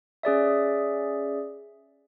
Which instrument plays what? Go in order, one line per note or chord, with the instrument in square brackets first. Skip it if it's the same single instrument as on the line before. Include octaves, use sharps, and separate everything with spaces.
[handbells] C#4 G#4 D5 E5